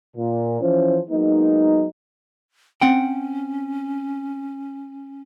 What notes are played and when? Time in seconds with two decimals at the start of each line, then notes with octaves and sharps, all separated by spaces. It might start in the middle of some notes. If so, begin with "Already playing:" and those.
0.16 A#2
0.61 E3 F3 C#4 C5
1.10 F#3 G#3 A#3 B3 D#4
2.81 C4 C#4 F#5 G5